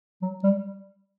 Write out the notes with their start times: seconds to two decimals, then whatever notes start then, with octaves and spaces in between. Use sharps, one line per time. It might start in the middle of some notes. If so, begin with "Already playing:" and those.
0.22 F#3
0.43 G3